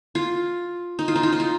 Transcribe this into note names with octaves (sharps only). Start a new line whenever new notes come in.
F4
D#4
F4
D#4
F4
D#4
F4